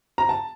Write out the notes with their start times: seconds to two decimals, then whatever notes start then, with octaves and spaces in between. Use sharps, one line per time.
0.18 A#5
0.29 A5